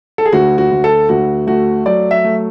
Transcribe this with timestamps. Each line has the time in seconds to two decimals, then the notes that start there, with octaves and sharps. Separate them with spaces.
0.18 A4
0.25 G#4
0.33 D2 F#4
0.58 F#4
0.71 D2
0.84 A4
1.09 D2 F#4
1.47 A3 F#4
1.86 F#3 D5
2.11 E5
2.24 A3